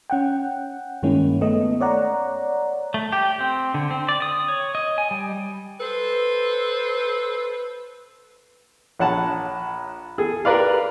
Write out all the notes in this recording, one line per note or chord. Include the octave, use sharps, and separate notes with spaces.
C#4 F#5 G5
G2 D#3 G#3 A#3 C#4 E4
A3 B3 D#5
C#5 D5 F#5 A#5
A3
G4
C4
D3
C4
D5
D#6
C#5
D#5
G#5
G3
A4 B4 C5
A#1 C#5 F#5 A5
G#4 A4
G4 A#4 B4 D5 F5